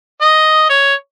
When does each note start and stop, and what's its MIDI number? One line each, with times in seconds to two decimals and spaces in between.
0.21 0.68 75
0.70 0.94 73